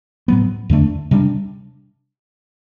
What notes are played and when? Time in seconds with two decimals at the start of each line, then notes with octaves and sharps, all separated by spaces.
0.28 A2 F#3 B3
0.70 E2 D3 A3 D4
1.11 C3 G3 D4